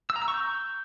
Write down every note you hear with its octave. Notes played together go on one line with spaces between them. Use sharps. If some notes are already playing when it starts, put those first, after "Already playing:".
E6
A#5
E6
C#6
G6